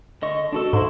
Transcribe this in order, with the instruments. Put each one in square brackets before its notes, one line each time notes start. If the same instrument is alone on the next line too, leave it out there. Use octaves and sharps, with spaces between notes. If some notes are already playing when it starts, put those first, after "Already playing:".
[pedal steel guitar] D3 D#5 C#6
D4 F#4 A4
[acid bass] G#2 [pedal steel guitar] E4 C6